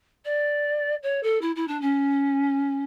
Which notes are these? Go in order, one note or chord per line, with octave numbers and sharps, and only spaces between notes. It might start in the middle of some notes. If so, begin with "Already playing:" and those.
D5
C#5
A4
E4
E4
D4
C#4